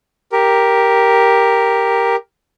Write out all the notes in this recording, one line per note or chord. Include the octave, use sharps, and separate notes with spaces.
G4 A#4